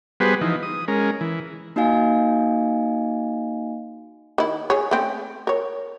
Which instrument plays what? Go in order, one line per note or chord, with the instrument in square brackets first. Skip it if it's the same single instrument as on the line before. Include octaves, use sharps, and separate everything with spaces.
[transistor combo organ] G3 B3 F#4 G#4 B4 C5
E3 F3 D#4
D#6
G#3 C#4 A#4
E3
[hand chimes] A#3 D#4 F#4 D#5 F5 G#5
[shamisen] D#3 E4
G#4 C#5
A3 C4 C#4
A#4 C#5